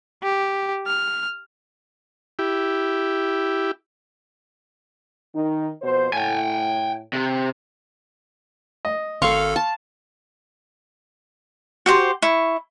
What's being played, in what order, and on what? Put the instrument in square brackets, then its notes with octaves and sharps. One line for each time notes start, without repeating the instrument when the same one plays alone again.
[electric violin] G4
F6
[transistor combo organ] E4 G4
[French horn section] D#3 D#4
F2 B2 C5
[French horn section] A2 [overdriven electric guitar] G5 G#5
[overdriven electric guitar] C3
[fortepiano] D#5
[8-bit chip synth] G#1 A4 [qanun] F5 C#6 [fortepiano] C6
[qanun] A5
[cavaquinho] F#4 G4 C5 C6
E4 C#6